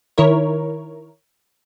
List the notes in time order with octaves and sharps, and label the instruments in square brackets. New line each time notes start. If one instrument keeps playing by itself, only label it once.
[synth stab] D#3 E4 A#4 C#5